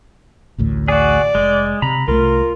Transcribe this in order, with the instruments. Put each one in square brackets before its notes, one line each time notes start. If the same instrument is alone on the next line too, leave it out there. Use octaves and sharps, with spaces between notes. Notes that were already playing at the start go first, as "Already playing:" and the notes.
[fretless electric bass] A1 D2 A2
[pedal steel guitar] F#4 G#4 [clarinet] D5
[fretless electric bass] F1 [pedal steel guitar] G#3
[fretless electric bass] C3 [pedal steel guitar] A#5 B5
[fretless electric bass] C2 F3 A3 [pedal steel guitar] F4 [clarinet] A#4